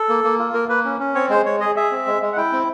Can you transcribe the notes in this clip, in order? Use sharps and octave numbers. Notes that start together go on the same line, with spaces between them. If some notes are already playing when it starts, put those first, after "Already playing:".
Already playing: A4
A#3
A#3
F4
A#3 A#4
A#3 B4
C#4
C#4
C4 C#5
G#3 C5
G#3 C#5
G#4 D#5
G#4 E5
C4
G#3
G#3
F#5
E4 G5
C4